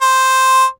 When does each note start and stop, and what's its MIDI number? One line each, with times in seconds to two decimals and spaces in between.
0.01 0.65 72